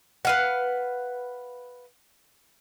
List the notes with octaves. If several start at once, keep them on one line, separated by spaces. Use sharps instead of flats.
B4 F5 F#5